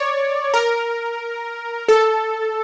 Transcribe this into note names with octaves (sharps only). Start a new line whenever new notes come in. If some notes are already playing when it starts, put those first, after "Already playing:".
Already playing: C#5 D5
A#4
A4